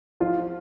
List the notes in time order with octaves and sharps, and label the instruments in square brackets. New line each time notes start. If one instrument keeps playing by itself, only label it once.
[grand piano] F3 [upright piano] F4